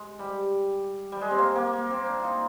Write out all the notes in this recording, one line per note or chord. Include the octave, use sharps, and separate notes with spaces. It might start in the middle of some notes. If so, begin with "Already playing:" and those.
Already playing: G#3
G3
G3
G#3
C4
A#3
A#3
A#3
C4
D4
D#4 F4